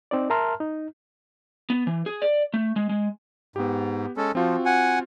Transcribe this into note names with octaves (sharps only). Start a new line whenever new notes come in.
C4 D#4 D5
A#4 E5 A5 A#5 C6 F6
D#4
B3
E3
G#4
D5
A3
G#3
G#3
G#2 B3 G4
G#3 C#4 A4
F3 C4 F4 F#4
F#5 G#5